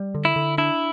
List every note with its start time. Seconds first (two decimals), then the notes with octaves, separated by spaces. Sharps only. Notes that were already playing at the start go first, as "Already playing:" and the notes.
Already playing: G3
0.15 D3
0.25 E4
0.36 D3
0.58 D4 E4